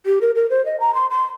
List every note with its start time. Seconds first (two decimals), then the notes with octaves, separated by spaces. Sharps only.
0.06 G4
0.21 A#4
0.35 A#4
0.50 C5
0.66 D#5
0.80 A#5
0.95 C6
1.10 C6